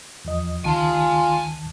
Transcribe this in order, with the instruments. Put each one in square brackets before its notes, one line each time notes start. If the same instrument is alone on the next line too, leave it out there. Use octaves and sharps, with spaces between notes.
[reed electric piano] E2 F3 D#5
[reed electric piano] C#2 D#3 A5 [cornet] F4 [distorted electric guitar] G#5 C6